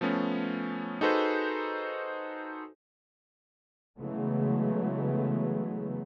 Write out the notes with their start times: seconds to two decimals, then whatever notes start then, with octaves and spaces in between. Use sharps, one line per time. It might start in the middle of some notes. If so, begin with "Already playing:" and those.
0.01 F3 A3 B3 C#4
1.01 D#4 F#4 G#4 A4 B4 C5
3.99 C#3 E3 F#3 G#3 A3 B3